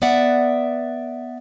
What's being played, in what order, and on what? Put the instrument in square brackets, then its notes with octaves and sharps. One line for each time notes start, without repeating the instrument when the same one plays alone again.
[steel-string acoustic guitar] B3 D5 E5 F#5